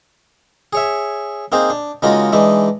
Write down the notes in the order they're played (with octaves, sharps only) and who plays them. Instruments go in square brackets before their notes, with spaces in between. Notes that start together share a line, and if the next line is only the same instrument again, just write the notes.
[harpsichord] G#4 C#5 E5
A#3 C4 D#4 G#4 C5
D4
C#3 G#3 A#3 D#4 F4 F#4
E3 G#3 D4 D#4